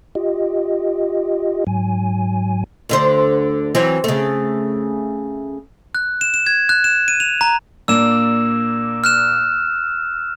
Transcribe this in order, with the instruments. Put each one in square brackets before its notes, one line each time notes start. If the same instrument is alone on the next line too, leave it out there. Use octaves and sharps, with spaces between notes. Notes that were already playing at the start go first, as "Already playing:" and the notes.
[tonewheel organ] F4 G4 D#5
G#2 F#3 G#5
[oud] D2 D3 C5
E3 F#3 C4
C#3 A3
[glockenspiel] F#6
E7
E7
G#6
F#6
E7
D#7
F7
A#5
[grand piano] A#2 A#3 D4 [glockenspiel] E6 E7
[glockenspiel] F6 F#6 E7